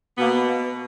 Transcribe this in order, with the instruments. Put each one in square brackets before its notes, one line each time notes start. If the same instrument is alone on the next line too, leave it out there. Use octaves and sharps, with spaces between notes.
[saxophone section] B2 A#3 B3